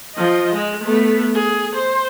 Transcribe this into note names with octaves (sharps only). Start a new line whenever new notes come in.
F3 D#5
G#3
A3 B3
G#4
C5